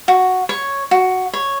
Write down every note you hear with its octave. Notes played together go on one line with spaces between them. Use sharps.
F#4
C#5
F#4
C#5